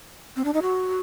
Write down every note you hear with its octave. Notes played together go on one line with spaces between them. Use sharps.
C4
D4
D#4
F#4